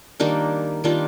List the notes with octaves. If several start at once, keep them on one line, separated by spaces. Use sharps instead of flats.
D#3 G3 A#3 D4
D#3 G3 A#3 D4 F4